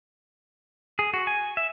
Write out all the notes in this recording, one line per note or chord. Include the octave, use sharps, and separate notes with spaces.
G#4
F#4
G#5
E5